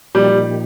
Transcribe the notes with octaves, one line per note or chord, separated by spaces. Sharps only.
A#2 F3 G3 A#3 D#4 G4